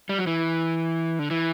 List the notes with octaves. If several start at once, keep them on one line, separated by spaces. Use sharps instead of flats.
G3
F#3
E3
D3
E3